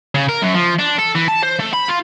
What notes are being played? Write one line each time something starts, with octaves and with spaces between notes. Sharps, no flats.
C#3
A#4
F#2
F3
D4
A4
E3
A5
C5
A3
B5
F4